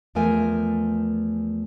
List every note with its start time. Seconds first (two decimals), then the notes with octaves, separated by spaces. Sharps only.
0.15 E2 F3 A3 A#4 G#5